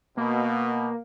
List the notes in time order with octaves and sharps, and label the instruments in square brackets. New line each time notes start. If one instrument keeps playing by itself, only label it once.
[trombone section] B2 [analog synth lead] A#3